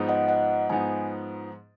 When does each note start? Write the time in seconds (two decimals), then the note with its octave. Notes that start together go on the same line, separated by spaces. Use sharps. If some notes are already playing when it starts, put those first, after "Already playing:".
Already playing: G#2 F3 B3 D#4
0.09 D#5 F#5
0.28 D#5 F#5
0.69 G#2 F3 B3 D#4 G#5